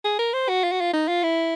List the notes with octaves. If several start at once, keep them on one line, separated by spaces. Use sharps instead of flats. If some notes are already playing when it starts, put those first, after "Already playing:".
G#4
A#4
C5
F#4
F4
F#4
F4
D#4
F4
E4